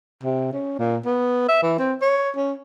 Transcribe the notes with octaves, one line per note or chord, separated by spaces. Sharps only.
C3
C#4
A#2
B3
E5
E3
C4
C#5
C#4